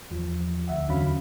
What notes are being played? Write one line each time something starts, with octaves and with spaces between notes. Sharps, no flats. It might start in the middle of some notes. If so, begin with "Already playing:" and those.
E2 F3
D2 E5 F#5
E2 D3 F#3 C#4 F5 B5